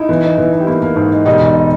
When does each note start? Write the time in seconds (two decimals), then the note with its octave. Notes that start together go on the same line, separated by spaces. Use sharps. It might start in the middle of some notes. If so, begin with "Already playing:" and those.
Already playing: D#4 E4
0.09 E3
0.23 D#4
0.38 E3
0.52 D#4
0.60 G4
0.67 A#3 E4
0.82 A#3
0.96 G#2
1.12 D#4
1.25 E1 D#4 G4
1.40 E1